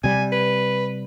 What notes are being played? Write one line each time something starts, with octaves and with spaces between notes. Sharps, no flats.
C3 G3 G#5
B4